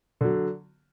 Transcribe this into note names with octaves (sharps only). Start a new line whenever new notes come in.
D3 F#3